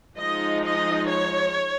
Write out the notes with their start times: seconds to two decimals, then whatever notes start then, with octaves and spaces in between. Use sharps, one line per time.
0.18 F3 G#3 D#4 D#5
0.64 D#5
1.10 C#5